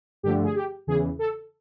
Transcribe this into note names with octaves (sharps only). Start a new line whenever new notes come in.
G2 D3 F3 A3 G4
G#4
G4
E2 C#3 E3 G#4
A4